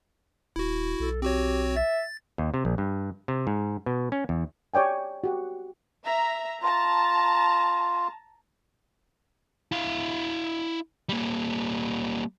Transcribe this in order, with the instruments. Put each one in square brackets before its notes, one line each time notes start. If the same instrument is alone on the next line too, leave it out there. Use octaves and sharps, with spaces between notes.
[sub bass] D#1 [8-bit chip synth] E4 F#4
[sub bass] B1 [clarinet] A4
[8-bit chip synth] C4 F#4 C#5 [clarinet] G4
[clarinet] E5 [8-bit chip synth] A6
[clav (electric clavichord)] D#2
C3
A#1
G2
C3
G#2
B2
C#4
E2
[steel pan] G4 C#5 D5 G5 G#5
F#4 G4 F#5
[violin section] E5 A#5
[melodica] F4 [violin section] A5 A#5
[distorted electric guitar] E4 F5
G3 A#3